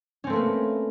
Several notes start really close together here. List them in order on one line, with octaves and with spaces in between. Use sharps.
C#4 C4 A3 A#3 B4